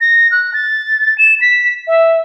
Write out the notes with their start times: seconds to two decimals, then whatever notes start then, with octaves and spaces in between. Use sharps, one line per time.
0.01 A#6
0.31 F#6
0.54 A6
1.18 E7
1.41 B6
1.87 E5